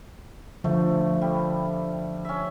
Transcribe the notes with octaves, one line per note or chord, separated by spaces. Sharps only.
D3 F3 A3
G3
C#4 E5